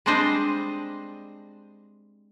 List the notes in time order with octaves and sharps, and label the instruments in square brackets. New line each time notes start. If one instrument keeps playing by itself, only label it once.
[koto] G3 G#3 C4 D4 C5 D#5